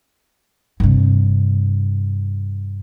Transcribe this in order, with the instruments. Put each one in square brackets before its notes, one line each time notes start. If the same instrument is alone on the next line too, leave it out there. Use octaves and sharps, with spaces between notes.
[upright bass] G2 C3